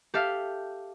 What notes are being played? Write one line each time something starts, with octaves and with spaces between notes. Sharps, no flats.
G4 A4 E5 F5